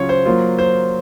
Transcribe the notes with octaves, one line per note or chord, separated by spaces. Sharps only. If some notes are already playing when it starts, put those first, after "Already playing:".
Already playing: C#3 F#3 C#4 F4 C#5
C5
F#3 A#3 F4
C5